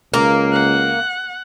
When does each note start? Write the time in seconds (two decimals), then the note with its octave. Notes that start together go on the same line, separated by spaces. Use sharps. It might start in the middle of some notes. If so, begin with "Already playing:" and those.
0.14 C#2 A#3
0.52 F#5